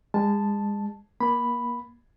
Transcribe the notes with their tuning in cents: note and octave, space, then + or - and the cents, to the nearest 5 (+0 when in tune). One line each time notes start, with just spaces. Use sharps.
G#3 -30 A5 +0
A#3 +25 B5 +0